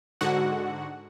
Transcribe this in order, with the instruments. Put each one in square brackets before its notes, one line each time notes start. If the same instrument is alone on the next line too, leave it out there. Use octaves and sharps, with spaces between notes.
[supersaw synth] G#2 D3 F#4 F#5